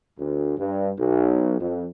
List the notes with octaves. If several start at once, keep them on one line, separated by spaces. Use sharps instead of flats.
D2
G2
B1
F2